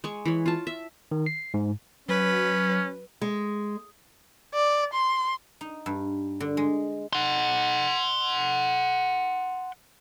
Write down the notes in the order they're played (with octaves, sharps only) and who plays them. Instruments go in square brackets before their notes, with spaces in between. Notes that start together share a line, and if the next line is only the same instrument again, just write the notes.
[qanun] G#3 C#6
E3 C#5
F4 A5
E5
[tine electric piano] D#3
C7
G#2
[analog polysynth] F#3 [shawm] C#4 [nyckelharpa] B4
[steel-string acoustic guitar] G#3
[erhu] D5
C6
[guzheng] D#4
G2
D3
G#3
[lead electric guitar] F#5 C6